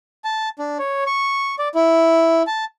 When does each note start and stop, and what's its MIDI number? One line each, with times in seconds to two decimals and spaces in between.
0.24 0.49 81
0.59 0.78 62
0.79 1.04 73
1.07 1.55 85
1.59 1.68 74
1.75 2.43 64
2.47 2.65 81